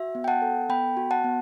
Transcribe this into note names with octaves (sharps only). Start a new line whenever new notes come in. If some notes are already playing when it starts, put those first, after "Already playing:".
Already playing: F#4 E5
B3
G5
F#5 A5
A4
B3 G5 B5
F#4
F#5 A5
B3